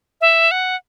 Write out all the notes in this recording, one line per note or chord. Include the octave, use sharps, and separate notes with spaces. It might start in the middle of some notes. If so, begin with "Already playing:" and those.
E5
F#5